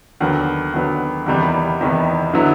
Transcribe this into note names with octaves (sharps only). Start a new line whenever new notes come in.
D#2 D3 F#3 B3
D#2 D3 F#3 B3
E2 C3 D#3 G3 B3
E2 C3 D#3 G3 B3
D3 F#3 B3 E4